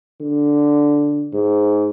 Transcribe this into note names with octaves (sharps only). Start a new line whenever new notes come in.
D3
G#2